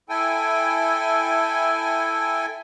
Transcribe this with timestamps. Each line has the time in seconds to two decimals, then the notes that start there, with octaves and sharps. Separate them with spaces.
0.09 E4 A4 G5 G#5